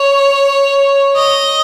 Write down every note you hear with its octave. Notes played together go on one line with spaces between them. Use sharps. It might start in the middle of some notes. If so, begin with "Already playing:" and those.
Already playing: C#5
D#5